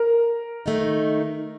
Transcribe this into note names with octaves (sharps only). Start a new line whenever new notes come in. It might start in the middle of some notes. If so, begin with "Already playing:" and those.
Already playing: A#4
D#3 A3 D#4